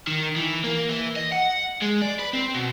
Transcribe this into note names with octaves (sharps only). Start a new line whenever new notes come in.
D#3
E3
A#3
E3
D#5
F#5
G#3
D5
B4
C4
B2